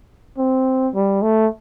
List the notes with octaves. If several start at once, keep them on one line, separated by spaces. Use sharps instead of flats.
C4
G3
A3